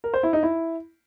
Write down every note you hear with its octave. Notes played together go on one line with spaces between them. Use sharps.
A#4
C5
E4
D#4
E4